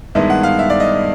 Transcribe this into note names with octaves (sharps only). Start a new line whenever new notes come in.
G2 D#3 G#3 B3 E4 E5
F#5
F5
E5
D5
D#5